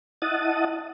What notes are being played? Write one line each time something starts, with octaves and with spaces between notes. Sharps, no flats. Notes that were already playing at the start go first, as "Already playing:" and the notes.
E4 D#5 F#5 A5 D#6